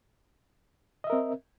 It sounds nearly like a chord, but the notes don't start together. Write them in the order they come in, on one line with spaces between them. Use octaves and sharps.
D#5 E5 A#4 C4